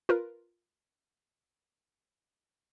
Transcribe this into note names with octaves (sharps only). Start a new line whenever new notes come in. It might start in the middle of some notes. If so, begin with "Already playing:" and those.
F4 A#4 B4